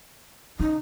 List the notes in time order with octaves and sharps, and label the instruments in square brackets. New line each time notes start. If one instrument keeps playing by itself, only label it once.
[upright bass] C#3 [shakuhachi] D#4